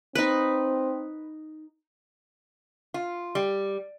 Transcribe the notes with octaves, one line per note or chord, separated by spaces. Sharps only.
C4 D#4 B4
F4
G3